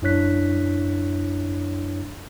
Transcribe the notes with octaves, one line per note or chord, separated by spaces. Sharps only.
F#2 D4 E4 C#5 F#6 B6